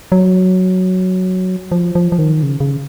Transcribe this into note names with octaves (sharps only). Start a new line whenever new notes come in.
F#3
F3
F3
F3
D#3
C#3
C#3